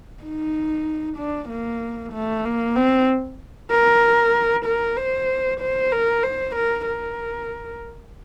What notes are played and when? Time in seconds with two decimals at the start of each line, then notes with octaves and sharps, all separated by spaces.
0.23 D#4
1.18 D4
1.49 A#3
2.13 A3
2.45 A#3
2.76 C4
3.71 A#4
4.65 A#4
4.97 C5
5.60 C5
5.92 A#4
6.23 C5
6.56 A#4
6.87 A#4